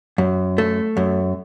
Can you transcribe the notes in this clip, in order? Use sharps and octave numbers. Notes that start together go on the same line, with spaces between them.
F#2
A3
F#2